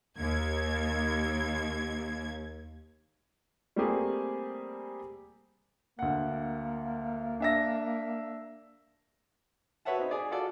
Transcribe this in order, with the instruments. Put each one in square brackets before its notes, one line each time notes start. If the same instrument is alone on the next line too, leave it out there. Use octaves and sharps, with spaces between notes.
[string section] D#2 G#6
[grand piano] G3 A3 A#3 C4 G4 G#4
[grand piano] D2 F#5 [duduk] A#3
[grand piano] D4 E5 A#6
[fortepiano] F#4 B4 C#5 E5 F#5 A5
C4 D#4
G#4 D5
F4 F#4 A4 D5